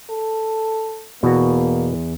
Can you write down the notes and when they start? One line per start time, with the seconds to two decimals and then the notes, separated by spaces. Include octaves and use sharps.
0.10 A4
1.23 E2 B2 A#3 F#4